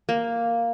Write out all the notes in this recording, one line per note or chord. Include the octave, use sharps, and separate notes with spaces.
A#3